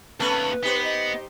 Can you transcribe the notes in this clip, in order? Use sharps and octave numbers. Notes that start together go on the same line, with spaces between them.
D#2 A3 B3 C#4 B4 B5
B3 D#4 G4 C5
D#5